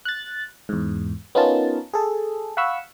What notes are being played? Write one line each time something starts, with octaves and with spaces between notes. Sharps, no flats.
F#6 A6
E2 G#2
B3 C#4 D#4 F4 A#4 A5
G#4 A4
F5 F#5 B5 C#6 E6